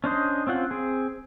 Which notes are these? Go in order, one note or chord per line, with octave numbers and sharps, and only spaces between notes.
C#4 D4 C5 D#5
C4 C#4 F4 F#5
C4 G#4